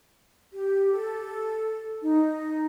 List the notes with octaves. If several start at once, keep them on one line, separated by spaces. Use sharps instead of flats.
G4
A4
D#4